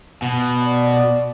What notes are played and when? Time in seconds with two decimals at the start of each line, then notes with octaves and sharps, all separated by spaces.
0.22 B2
0.63 D5